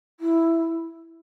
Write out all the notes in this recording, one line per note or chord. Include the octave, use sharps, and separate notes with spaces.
E4